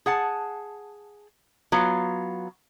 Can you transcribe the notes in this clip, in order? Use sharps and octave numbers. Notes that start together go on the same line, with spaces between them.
G#4 F#5 A5
F#3 B3 F4